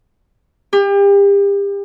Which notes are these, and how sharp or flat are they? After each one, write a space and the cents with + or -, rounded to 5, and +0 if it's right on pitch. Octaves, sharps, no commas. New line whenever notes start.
G4 +35